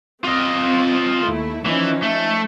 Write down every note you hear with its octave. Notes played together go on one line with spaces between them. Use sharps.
C4 F4 D#5
D#2 A3 E4
E3 F3 C#4 D#4
A3